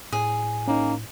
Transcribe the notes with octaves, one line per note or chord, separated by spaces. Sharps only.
A2 G#4
A#3 C#4 D#4